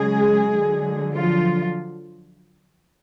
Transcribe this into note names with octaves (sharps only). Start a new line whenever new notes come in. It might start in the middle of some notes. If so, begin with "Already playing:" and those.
Already playing: C#3 F#3 G#3 G#4
D3 F#3
F3 F4